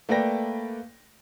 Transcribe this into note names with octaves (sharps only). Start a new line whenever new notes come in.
A3 A#3 B4 D5 G5 A#6